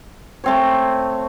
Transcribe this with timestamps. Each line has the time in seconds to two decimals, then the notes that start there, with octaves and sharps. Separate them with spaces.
0.44 A3 C4 C#5